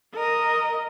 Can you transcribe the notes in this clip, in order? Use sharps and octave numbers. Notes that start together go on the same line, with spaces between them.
A#4 D#5